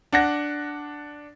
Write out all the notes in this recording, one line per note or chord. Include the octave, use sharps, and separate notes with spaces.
D4 F#5 A#6